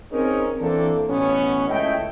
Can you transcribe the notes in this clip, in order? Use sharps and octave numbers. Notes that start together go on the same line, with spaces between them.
C4 C#4 D#4 G#4 A#4
E3 A#3 C4 D4 A4
A1 B2 B3 C#4
C#2 A3 E4 D#5 G5